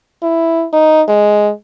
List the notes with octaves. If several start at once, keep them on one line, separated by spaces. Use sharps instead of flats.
E4
D#4
G#3